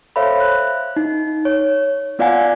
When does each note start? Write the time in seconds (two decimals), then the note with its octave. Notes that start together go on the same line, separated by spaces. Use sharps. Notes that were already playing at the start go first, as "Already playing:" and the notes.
0.16 A4 C5 C#5 E5 F5 B5
0.40 F#6
0.96 D#4
1.45 C#5
2.19 B3 F4 D5 F5 F#5 G#5